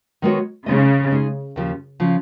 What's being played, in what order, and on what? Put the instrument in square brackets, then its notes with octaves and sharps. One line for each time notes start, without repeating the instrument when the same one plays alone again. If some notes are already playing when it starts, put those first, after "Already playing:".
[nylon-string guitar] D#3 G#3 B3 F#4 C#5
[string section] C#3 [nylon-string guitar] G#3 D#4 G#4 D#5
[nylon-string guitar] G#3 D#4 G#4 D#5
D#2 C#3 F3
C#3 F3